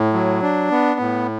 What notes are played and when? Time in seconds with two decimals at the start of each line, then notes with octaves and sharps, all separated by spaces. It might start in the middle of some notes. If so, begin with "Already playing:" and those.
Already playing: A2
0.13 F#3
0.42 D4
0.71 B3
1.00 A2